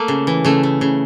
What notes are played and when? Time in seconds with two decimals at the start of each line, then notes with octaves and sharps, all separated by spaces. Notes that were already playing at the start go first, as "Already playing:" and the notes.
Already playing: A3 A#3
0.08 C#3
0.27 E3
0.45 C#3 A3
0.63 A3
0.81 C#3